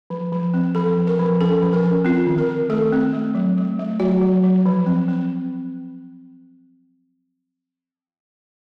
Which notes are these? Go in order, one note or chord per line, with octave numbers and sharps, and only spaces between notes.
F3
F3
C4
F3 A4
F3
A#4
F3
C#4 A4
F3
A#4
C#4
C4 F4
D#3
A#4
D#3
A3 A4
C4
A3
F#3
A3
A3
F#3 F#4
F#3
F#3
F3
C4
C4